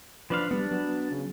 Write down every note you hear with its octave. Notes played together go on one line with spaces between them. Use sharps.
F3 D4 B4 F5
G3 B3 D4
F#3 B3
C#3